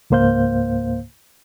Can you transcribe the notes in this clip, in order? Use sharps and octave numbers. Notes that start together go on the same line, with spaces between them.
C#2 G#2 A#3 C5 F5 G6